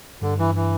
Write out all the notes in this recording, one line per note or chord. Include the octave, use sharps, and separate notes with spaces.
G2 D3
E3
E3